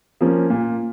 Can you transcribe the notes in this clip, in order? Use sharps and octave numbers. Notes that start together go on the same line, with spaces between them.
F3 A#3 C#4
A#2